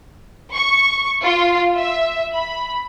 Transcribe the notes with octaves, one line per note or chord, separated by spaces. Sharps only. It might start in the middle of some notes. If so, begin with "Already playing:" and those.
C#6
F4
E5
B5